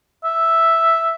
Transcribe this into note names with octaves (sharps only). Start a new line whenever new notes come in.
E5